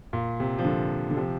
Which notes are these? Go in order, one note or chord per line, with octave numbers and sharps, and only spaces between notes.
A#2
C3
F3
A#2 D3
D3
C3 F3